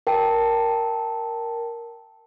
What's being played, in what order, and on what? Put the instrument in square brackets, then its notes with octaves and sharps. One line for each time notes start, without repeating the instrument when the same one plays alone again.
[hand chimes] A#4 G5 A5